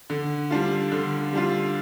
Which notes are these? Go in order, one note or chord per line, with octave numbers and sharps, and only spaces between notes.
D3
G3 D4 F4
D3
G3 D4 F4